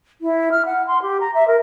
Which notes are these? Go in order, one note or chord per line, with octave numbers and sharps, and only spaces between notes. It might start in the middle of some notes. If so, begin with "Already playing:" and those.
E4
F6
F#5
C6
G4
A#5
E5
A#4